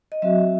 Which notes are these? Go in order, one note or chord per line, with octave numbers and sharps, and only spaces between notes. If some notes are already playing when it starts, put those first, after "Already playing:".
D#5
F#3 C4 F#4 E5